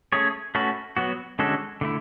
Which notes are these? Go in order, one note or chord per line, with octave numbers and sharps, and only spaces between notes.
A3 C#4 G#4 C#5
A3 C#4 F#4 B4
F#3 B3 F#4
D3 G#3 C#4 F#4 A4
D3 A3 E4